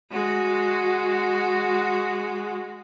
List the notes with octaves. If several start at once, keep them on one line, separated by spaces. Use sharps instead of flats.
G#3 F#4